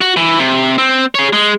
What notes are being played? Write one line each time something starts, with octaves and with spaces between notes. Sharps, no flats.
F#4
E3
C3
C4
G#4 C#5
G#3